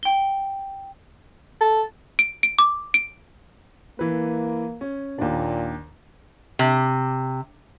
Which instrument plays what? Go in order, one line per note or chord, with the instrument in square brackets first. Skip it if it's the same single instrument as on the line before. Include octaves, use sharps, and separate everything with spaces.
[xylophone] G5 G7
[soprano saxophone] A4
[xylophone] D7
D7
D6
D7
[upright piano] E3 B4 [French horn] A#3
[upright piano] C#4
[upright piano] D#2 D4 [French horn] A#2
[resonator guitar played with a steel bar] C3